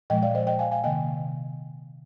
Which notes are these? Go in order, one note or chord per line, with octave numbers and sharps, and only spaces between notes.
A#2 F3 G#3 D#5 G5
D5 F5
C5 D#5
D#5 G5
F5 G#5
F5 G#5
C3 D#3 A#3 D#5 G5